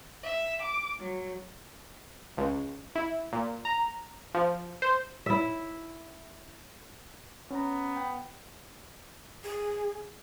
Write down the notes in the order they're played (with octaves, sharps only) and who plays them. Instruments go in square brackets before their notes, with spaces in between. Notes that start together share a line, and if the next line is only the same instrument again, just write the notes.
[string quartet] E5
D6
F#3
[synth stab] C#2
E4
A#2
A#5
F3
C5
[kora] E4 E5
[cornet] B3 [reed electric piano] C#4 A#5
[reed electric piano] G5
[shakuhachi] G#4